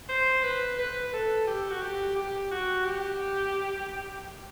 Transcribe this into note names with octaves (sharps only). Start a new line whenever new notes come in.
C5
B4
B4
A4
G4
F#4
G4
G4
F#4
G4